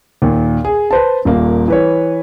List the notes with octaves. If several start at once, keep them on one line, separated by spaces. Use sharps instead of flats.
D#2 A#2
G#4
B4 C5 A5
D#1 A#3
E3 B4 C#5